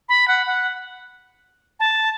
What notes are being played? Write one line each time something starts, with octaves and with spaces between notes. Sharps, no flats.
B5
F#5
F#5
A5